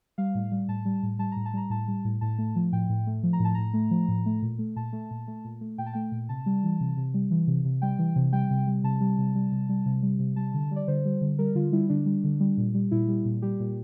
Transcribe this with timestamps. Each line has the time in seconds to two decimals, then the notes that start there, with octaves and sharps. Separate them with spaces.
0.18 G3 F5
0.35 A2
0.51 G3
0.68 A2 A5
0.85 G3
1.03 A2
1.19 G3 A5
1.32 A2 A#5
1.46 A5
1.53 G3 A#5
1.70 A2 A5
1.88 G3
2.05 A2
2.21 A2 A5
2.38 A3
2.56 F3
2.73 A2 G5
2.89 A2
3.07 A3
3.23 F3
3.33 A#5
3.40 A2 A5
3.55 A2 A#5
3.74 A3
3.91 F3
4.08 A2
4.26 A3
4.42 A#2
4.59 A3
4.76 A#2 A5
4.93 A3
5.11 A#2
5.28 A3
5.45 A#2
5.61 A3
5.78 A#2 G5
5.86 A5
5.93 A3 G5
6.12 A#2
6.29 C3 A5
6.46 G3
6.63 E3
6.80 C3
6.97 C3
7.14 G3
7.31 E3
7.47 C3
7.65 C3
7.82 G3 G5
7.99 E3
8.16 C3
8.32 G3 G5
8.50 C3
8.67 G3
8.84 C3 A5
9.01 G3
9.18 C3
9.35 G3
9.52 C3
9.69 G3
9.86 C3
10.03 G3
10.19 C3
10.36 G3 A5
10.54 D3
10.71 G3
10.76 D5
10.88 D3 C5
11.05 G3
11.21 D3
11.39 G3 A#4
11.55 D3 F4
11.72 G3 E4
11.89 D3 D4
12.06 G3
12.24 D3
12.40 G3
12.58 A#2
12.74 G3
12.91 A#2 E4
13.08 G3
13.25 A#2
13.42 G3 G4
13.60 A#2